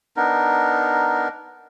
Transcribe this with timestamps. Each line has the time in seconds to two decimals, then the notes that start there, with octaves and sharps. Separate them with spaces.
0.16 B3 D4 D#4 A#4